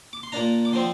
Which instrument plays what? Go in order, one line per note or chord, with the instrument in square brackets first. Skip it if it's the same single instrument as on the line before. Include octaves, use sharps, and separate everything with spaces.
[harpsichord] D6
C6
A#2 A#3 D4 A#5
D6
D3 F3 C4 C6